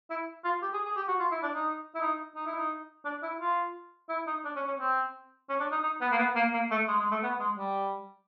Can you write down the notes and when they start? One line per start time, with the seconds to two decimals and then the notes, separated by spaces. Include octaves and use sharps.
0.10 E4
0.45 F4
0.62 G4
0.73 G#4
0.85 G#4
0.96 G4
1.08 F#4
1.20 F4
1.31 E4
1.43 D4
1.55 D#4
1.95 E4
2.01 D#4
2.36 D#4
2.46 E4
2.56 D#4
3.05 D4
3.23 E4
3.41 F4
4.09 E4
4.27 D#4
4.45 D4
4.56 C#4
4.67 C#4
4.79 C4
5.49 C#4
5.60 D4
5.72 D#4
5.83 D#4
6.01 B3
6.12 A#3
6.18 B3
6.36 A#3
6.54 A#3
6.71 A3
6.88 G#3
7.00 G#3
7.11 A3
7.23 B3
7.40 G#3
7.58 G3